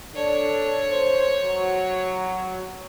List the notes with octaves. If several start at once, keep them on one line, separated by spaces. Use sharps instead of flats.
D4 A4 C#5
C5
F#3